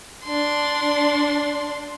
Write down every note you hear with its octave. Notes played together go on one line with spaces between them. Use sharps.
D4 C6